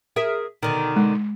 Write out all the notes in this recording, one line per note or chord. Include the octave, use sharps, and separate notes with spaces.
G#4 A#4 E5
B2 D3 D#3
G#3